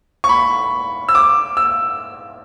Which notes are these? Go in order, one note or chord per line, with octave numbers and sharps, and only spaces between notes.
C#6
B5
E6
D6
E6